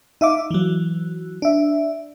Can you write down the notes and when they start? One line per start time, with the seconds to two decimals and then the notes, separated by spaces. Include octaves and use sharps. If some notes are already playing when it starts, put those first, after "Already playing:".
0.21 D#4 E5 F5 D6
0.51 E3 F#3
1.42 D4 E5